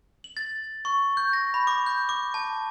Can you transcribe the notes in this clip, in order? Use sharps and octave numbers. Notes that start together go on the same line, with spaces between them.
F#7
A6
C#6
G6
A#6
B5
D6
G6
D6
A5